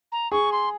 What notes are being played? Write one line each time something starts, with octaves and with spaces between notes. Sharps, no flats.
A#5
G#4 C#6
C6